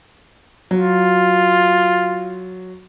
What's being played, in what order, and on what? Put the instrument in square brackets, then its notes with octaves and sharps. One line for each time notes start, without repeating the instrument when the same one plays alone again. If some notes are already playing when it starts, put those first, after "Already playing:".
[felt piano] F#3 [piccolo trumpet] F4